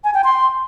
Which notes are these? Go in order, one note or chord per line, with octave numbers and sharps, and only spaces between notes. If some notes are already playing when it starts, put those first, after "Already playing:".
G#5
G5
C6